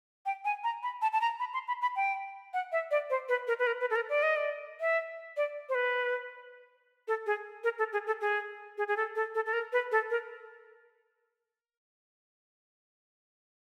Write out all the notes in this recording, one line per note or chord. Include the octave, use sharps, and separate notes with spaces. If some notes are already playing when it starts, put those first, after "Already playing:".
G5
G#5
A#5
B5
A5
A5
A#5
B5
C6
B5
B5
G5
F#5
E5
D5
C5
B4
A#4
B4
A#4
B4
A4
A#4
D5
D#5
D5
E5
D5
C5
B4
A4
G#4
A#4
A4
G#4
A4
G#4
G#4
G#4
A4
A4
A4
A4
A#4
B4
A4
A#4